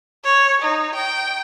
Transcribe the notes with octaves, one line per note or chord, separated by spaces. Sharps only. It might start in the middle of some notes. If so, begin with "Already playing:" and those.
C#5
D#4
G5